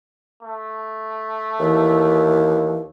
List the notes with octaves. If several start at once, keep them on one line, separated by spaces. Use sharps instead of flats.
A3
D#2 E3